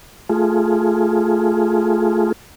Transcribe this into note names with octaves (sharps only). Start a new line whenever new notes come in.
A3 F4 G#4